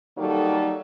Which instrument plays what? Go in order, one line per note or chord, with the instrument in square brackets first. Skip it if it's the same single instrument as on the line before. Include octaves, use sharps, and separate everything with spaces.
[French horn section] D#3 F#3 G3 A#3 D#4 A4